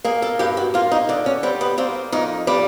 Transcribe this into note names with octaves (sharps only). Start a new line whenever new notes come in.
A#3 G#4
A4
G2 G4
F#4
A#3 F4
D#4
D3 D4
C#4
G3 C4
B3
A#3 C4
F2 D#4
G3 D4